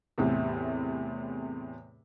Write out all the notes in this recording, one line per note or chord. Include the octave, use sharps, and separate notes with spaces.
E2 A2 C3